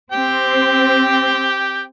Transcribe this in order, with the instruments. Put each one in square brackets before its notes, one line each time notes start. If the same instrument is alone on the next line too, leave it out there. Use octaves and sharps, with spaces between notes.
[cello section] C4 [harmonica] G4 G5